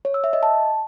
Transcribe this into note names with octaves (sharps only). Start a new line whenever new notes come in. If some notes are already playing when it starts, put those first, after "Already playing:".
C#5
E6
E5
D#5
A5